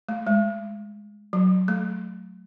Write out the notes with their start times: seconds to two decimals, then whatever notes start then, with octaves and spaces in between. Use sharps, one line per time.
0.09 A3
0.27 G#3
1.33 F#3
1.68 A3